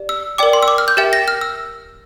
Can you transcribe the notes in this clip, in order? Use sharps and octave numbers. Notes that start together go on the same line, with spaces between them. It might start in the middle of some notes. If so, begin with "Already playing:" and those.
Already playing: G4 D5
E6
A#4 D5 G5 D6
C6
E6
D6
F6
G6
G4 A#4 E5 G5 A6
A#6
F6
E6